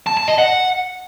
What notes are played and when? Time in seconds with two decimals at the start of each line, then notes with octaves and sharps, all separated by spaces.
0.07 A5
0.17 A5
0.28 D#5
0.38 F#5